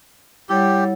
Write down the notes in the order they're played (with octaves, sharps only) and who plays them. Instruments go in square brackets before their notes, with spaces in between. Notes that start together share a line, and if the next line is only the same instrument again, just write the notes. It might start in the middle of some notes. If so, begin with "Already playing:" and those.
[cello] G3 [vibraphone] E4 C#5 F#5 [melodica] G4